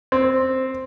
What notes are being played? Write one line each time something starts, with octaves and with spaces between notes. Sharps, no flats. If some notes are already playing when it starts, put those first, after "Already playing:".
C4